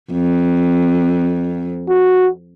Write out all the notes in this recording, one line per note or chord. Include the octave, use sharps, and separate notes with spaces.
F2
F#4